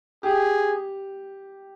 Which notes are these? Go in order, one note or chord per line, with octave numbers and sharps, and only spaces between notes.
G4 G#4